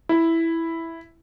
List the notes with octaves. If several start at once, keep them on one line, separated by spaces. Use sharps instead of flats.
E4